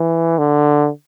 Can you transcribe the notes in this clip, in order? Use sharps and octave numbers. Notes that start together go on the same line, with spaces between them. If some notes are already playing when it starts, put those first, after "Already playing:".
Already playing: E3
D3